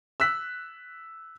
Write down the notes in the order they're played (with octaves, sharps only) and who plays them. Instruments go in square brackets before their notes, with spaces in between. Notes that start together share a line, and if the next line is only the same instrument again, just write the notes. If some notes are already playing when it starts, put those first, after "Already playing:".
[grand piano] E6 F#6 B6